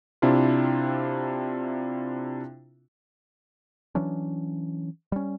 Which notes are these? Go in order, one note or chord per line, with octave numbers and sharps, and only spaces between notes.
C3 C4 D4 E4 F4
E3 F#3 C#4 D4
G3 C#4